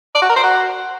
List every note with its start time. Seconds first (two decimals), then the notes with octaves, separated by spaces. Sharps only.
0.15 D5
0.22 F#4
0.29 A#4
0.36 C5
0.44 F#4